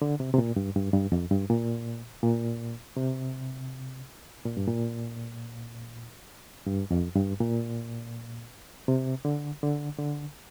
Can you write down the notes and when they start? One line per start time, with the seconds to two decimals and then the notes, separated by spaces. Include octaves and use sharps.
0.02 D3
0.20 C3
0.33 C3
0.38 A#2
0.56 G2
0.76 G2
0.93 G2
1.12 F2
1.31 G2
1.50 A#2
2.23 A#2
2.97 C3
4.45 A#2
4.57 G2
4.68 A#2
6.67 G2
6.91 F2
7.16 G2
7.40 A#2
8.88 C3
9.25 D3
9.63 D3
9.99 D3